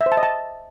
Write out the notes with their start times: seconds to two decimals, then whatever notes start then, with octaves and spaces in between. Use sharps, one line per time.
0.01 E5
0.06 C5
0.12 A5
0.17 D#5
0.23 A5